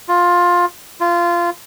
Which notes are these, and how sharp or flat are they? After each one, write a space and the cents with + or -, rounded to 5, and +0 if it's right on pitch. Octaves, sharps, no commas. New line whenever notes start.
F4 +15
F4 -15